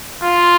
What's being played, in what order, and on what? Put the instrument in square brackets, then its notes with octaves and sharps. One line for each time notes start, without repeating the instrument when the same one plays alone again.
[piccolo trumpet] F4